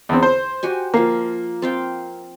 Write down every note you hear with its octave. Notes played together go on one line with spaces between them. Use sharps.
E2 C4
C5
F#4 G4 G#5
F3 A#3 F5
C4 F5 G5